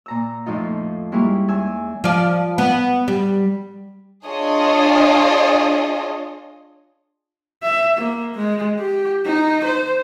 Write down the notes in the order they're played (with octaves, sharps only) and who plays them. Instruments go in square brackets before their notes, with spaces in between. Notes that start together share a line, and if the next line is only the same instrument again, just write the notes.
[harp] A#2 A#5 E6
F2 A2 F3 D#4 F4
G3 G#3 A#3 C#4 E4
E2 G#5 E6
[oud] F3 D5
B3
G3
[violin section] D4 F4 G#4 C#5 D#5
[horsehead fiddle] E5
A#3
G#3
G4
D#4
C5